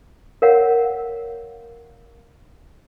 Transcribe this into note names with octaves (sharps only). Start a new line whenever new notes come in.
A#4 C#5 F5 F#5